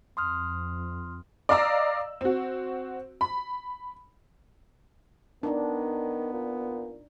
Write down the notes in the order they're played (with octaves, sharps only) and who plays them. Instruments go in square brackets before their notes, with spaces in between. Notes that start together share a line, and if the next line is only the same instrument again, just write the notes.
[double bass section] F2 [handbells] C6 D#6 F6
[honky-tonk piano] D5 D#5 F5 A#5 D6 E6
C4 F#4
B5
[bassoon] D#3 [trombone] B3 [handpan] D4 D#4
[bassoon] A#2